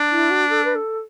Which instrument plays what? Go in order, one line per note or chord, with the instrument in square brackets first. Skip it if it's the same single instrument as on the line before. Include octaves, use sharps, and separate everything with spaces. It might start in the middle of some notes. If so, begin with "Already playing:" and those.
Already playing: [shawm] D4
[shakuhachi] E4
F#4
A4
B4
A4